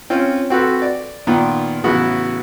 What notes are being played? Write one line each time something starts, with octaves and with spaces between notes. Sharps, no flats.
C4 C#4 F4
C4 F#4 A4 B4
D5
A#2 D#3 B3 F4
A1 C#3 B3 E4 F#4